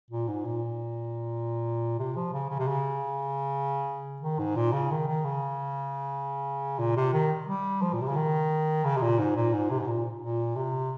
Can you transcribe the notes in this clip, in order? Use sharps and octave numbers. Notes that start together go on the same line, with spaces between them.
A#2
G#2
A#2
C3
F3
C#3
C#3
C3
C#3
D#3
G#2
A#2
C#3
D#3
D#3
C#3
A#2
C3
D#3
G3
F3
A#2
C3
C#3
D#3
C#3
C3
A#2
G#2
A#2
G#2
C3
G#2
A#2
A#2
C3